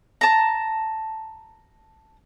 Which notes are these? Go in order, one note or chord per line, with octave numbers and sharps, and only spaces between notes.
A5 A#5